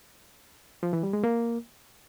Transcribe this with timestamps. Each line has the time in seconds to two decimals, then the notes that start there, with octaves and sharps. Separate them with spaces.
0.83 F3
0.93 E3
1.03 G3
1.13 G#3
1.24 A#3